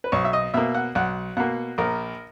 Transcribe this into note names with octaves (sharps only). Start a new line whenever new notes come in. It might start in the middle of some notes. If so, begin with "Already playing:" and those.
B4
B1 C#5
E5
D#5
B2 A#3 E5
F#5
B1 F#5
B2 A#3 F#5
A#1 A#4